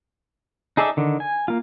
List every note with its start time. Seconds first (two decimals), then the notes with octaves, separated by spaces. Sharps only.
0.77 D#4 G#4 A4 D5 E5
0.97 D3 D#3
1.20 G#5
1.48 A#3 F4